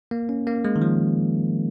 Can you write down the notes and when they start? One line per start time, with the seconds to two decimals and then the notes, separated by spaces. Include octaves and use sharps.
0.11 A#3
0.29 C#4
0.47 A#3
0.65 G#3
0.76 D#3
0.82 F3